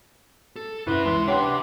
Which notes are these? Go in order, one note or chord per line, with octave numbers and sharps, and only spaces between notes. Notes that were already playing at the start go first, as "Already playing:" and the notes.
A4
F#2 C3 E4 B4 E5 C6
C#2 E3 B3 C6
D4 G4 B4 C#5 F#5 C6